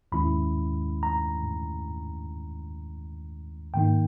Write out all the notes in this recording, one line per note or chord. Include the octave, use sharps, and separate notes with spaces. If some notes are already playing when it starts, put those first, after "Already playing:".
D#2 D#3 G#3 C#4 E4 B5
A#5
G#2 D#3 A#3 D#4 G5